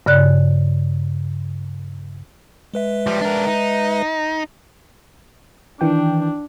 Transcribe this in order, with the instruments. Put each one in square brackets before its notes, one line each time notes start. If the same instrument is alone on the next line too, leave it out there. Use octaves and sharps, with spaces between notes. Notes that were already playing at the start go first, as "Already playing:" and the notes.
[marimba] G2 C#3 D5 F#6
[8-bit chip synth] G#3 B4 E5
[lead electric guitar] F3 G3
D4 A#4
D#4
[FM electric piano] D#3 E3 G5 [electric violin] D4